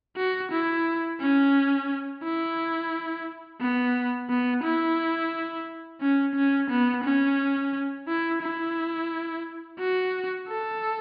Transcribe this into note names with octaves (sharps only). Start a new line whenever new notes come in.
F#4
E4
C#4
E4
B3
B3
E4
C#4
C#4
B3
C#4
E4
E4
F#4
A4